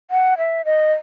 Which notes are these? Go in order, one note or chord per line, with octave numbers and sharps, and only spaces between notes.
F#5
E5
D#5